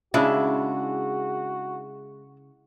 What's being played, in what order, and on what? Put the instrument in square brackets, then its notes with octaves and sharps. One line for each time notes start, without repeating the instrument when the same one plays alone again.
[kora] C#3 G#3 D4 [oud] E4 [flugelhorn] F#4